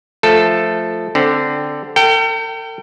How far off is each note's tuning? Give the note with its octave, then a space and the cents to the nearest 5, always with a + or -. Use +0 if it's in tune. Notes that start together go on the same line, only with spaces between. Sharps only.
F3 +0 A3 +0 A4 +0
D3 +0 C4 +0
A4 +45 G5 -15